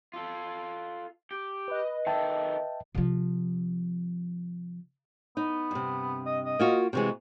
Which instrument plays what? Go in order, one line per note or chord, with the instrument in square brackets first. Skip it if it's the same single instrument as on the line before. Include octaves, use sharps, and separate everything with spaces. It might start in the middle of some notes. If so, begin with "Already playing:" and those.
[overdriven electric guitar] F4 A4
G4
[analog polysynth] B4 D#5
[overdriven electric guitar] D#3 A4 [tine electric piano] E5 G5 A5
[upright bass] C3 F3
[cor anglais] B3 [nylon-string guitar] D#4
[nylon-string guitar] G2 C3
[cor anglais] D#5
D#5
[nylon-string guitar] A#3 F4 F#4
[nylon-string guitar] C3 E3 G#3 [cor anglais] F#4